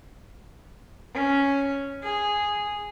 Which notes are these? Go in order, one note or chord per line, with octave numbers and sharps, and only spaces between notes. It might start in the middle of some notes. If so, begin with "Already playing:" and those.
C#4
G#4